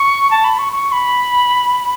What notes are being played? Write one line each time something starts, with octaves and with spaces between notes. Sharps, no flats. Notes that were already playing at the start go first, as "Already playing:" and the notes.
Already playing: C#6
A5
B5
C#6
C#6
B5